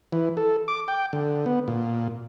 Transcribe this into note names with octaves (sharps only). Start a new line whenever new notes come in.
E3
A4
D6
G5
D3
B3
A#2